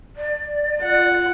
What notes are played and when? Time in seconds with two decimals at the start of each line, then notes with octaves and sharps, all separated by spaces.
0.16 D5
0.81 F4 F#5